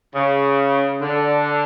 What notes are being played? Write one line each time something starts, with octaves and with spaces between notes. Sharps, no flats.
C#3
D3